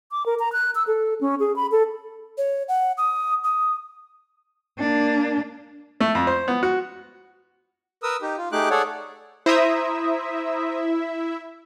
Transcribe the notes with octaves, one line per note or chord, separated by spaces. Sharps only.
D6
A#4
A#5
F#6
E6
A4
C#4
G#4
B5
A4
C#5
F#5
D#6
D#6
A#3 D4
A3
F2
C5
B3
F#4
A#4 B4 D#6 E6
D#4 G4
F4
A3 D#4 G4 G#4 D6 F#6
G#4 A4 C#5 D5 F#5
E4 C5 E5 A#5 D#6